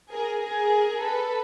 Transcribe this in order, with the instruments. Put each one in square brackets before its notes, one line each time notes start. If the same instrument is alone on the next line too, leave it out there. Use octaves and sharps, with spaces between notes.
[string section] G#4 A#4
G#4 A#4
A4 B4